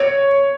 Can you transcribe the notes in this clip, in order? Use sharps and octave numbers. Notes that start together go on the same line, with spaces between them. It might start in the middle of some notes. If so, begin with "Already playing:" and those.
Already playing: C#5